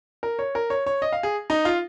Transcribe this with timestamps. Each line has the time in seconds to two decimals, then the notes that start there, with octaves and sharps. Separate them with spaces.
0.23 A#4
0.39 C#5
0.55 A#4
0.70 C#5
0.86 C#5
1.02 D#5
1.12 F5
1.23 G#4
1.50 D#4
1.65 F4